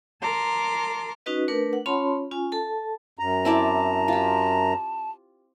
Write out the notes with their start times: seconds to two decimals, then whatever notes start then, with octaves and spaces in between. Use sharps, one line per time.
0.23 A#4 A5 A#5 C6 D6
1.26 C#4 D#4 F#4 B4 D#5
1.48 A3 D4 A#4 B4
1.73 F#5
1.86 C#4 F4 C#5 A5 B5 C6
2.31 C#4 F4 G#5
2.52 A4 A5
3.19 F#2 A#5
3.45 C4 E4 D5 A5
4.08 F4 G4